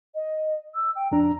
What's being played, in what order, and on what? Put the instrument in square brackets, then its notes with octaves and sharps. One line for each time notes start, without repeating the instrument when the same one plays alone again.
[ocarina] D#5
E6
G5
[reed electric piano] F2 D4 [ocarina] A#5